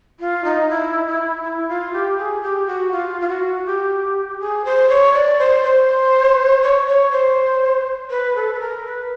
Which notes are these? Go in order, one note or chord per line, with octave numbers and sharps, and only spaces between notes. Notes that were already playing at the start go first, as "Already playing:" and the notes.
F4
D#4
E4
E4
E4
F4
G4
G#4
G4
F#4
F4
F4
F#4
G4
G#4
C5
C#5
D5
C5
C5
C#5
C#5
C5
B4
A4
B4
A#4
B4